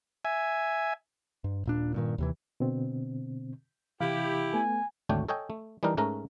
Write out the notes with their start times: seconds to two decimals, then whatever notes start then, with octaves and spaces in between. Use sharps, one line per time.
0.25 E5 G#5
1.44 G2
1.66 D#1 A#2 D4
1.94 G2 A#2 D#3
2.18 D#2 C3 E3
2.60 B2 D3 C4
4.01 C3 E3 E4 G4 F5
4.54 A3 B3 G#5
5.09 G#1 D2 A3 D4 C#5 G5
5.29 A4 C#5 D#5 G5 G#5
5.50 A3
5.83 E3 G3 D4 D#4 A#4
5.97 G#2 A3 C#4 A#4 A#5